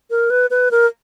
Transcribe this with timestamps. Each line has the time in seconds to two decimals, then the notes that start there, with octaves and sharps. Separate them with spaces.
0.10 A#4
0.30 B4
0.50 B4
0.71 A#4